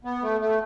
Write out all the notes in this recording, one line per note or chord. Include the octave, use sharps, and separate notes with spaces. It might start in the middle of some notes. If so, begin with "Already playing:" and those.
B3
A3
A3